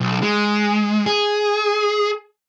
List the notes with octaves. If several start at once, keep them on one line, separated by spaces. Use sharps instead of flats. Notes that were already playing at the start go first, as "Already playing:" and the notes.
B1
G#3
G#4